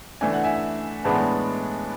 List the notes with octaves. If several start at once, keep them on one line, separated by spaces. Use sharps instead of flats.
E3 A3 D4 G#5
F#5
E5 G#5
A2 E3 G#3 B3 D4 F#5 A5